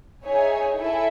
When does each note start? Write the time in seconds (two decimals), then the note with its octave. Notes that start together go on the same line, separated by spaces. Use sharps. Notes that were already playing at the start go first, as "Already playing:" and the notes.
0.24 D#4 G#4 C#5 E5 G#5
0.76 E4 A4 E5 G#5